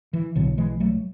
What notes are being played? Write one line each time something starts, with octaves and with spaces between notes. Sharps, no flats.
E3
B1 A2 D3 F#3
E3 G#3
F#3 A3